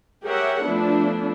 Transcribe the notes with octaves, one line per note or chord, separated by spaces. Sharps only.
G4 G#4 A#4 C#5 E5 F#5
F3 A3 B3 D4 E4